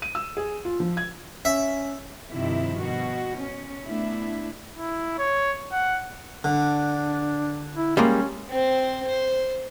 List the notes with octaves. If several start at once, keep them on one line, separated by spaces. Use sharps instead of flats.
D#7
E6
G#4
F4
F3
G#6
C#4 E5
G2 C3 D#3 F3 E4
B2 F#4
C#4
A3 B3 D4 E4
E4
C#5
F#5
D3 D4
E4
G3 G#3 A#3 C#4
C4 C5
C5